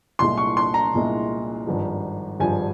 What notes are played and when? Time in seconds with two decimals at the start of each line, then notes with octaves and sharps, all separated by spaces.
0.19 C2 A#2 G#3 E4 C6
0.37 C#6
0.57 C6
0.74 A#5
0.94 C2 A#2 G#3 E4
1.67 G#1 G2 F3 G#3
2.39 G#1 G2 F3 G#3 G#5